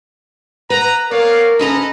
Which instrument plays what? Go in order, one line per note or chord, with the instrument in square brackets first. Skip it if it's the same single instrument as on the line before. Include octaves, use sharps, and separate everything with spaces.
[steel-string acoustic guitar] B4 [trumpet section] F#5 A#5
[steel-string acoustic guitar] B3 [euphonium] A#4 [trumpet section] C#5 D5 F5
[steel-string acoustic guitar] D2 C#4 A#5 [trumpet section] A4 B4 D#5